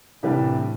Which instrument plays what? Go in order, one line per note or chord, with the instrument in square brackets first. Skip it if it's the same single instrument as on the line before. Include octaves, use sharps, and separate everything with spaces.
[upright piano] C2 C3 E3 G3 D4 [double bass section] A2